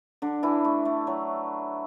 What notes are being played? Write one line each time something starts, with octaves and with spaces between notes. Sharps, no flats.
D3 D4
E3 E4
A3
A3
F#3